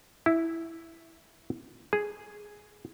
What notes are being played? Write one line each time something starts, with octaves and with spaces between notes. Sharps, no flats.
E4
G#4